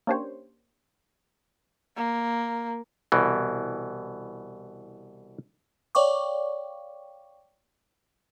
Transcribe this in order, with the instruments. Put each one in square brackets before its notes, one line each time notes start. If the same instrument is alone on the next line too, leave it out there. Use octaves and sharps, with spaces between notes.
[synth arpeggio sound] A#3 C#4 D4 G4 C5 C#5
[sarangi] A#3
[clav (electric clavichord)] C2 B2 E3
[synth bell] C#5 D5 F5 G5 C#6 D6